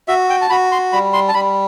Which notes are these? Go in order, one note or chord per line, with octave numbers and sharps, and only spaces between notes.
F#4 E5
G5
A5
F#4 B5
C6
G3 B5
C6
A5
G3 B5